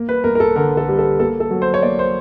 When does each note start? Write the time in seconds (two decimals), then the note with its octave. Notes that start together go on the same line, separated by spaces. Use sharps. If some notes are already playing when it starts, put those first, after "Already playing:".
Already playing: A#3
0.09 B4
0.24 A#3 A#4
0.35 A#4
0.40 A4
0.56 D3 A#4
0.77 A4
0.89 G3
0.99 A4
1.19 A#3 A4
1.40 A4
1.51 F#3
1.62 C5
1.74 C#5
1.82 A#3 D5
1.99 C5